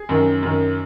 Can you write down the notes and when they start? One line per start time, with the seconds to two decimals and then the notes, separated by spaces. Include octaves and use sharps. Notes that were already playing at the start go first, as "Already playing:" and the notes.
Already playing: G#4
0.09 F#2 D#3
0.43 F#2 D#3